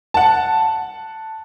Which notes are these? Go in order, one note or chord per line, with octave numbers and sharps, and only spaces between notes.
F#5 A5